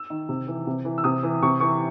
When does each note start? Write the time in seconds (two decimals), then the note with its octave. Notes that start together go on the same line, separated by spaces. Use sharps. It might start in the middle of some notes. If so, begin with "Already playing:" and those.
Already playing: E6
0.10 D#3
0.29 C3
0.48 E3
0.67 C3
0.85 E3
0.98 E6
1.04 C3 D#6
1.23 E3
1.42 C3 C#6
1.60 E3 C#6